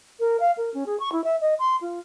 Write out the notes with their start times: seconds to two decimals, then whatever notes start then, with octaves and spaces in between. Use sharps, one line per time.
0.20 A#4
0.40 F5
0.57 A#4
0.74 C#4
0.86 G#4
1.00 C#6
1.12 E4
1.24 E5
1.41 D#5
1.59 C6
1.81 F4